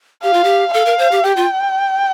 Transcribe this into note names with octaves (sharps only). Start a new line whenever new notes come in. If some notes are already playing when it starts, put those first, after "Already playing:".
G4 F5
F4
G4
A4 F5
A#4
C5
G4
G4 G5
F4